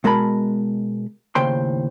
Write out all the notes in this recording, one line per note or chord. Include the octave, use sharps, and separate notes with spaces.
B2 G#3 A#4 A5 B5
D#2 A2 C#3 C5 G5 C6